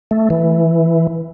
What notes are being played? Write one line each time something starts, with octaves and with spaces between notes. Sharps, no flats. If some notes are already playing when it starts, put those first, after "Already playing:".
A3
E3